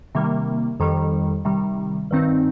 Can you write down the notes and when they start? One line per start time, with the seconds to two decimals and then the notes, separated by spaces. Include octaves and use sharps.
0.15 C3 D#3 G3 A#3
0.80 F2 D#3 G3
1.45 C3 D#3 G3
2.11 G2 D#3 C4 D#4